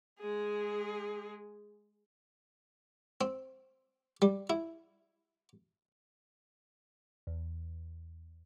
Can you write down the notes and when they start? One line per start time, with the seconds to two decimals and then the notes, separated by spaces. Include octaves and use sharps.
0.19 G#3 G#4
3.21 C4
4.22 G3
4.50 E4
7.27 E2